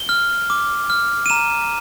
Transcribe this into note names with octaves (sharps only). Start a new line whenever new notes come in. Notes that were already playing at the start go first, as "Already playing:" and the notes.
Already playing: G7
F6
D6
F6
D#7
A#5 E7